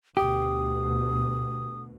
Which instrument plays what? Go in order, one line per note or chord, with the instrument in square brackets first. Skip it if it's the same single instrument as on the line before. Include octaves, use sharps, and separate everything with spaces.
[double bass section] D2 B2 [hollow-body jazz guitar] G4 [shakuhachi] D#6